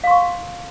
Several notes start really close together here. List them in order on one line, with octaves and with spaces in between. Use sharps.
F5 C6 C#6